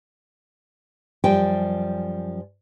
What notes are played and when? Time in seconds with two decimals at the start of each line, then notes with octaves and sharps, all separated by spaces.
1.24 F#2 F3 G3 G5 G#5